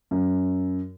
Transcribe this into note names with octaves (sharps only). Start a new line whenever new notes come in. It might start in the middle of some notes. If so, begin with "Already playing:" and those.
F#2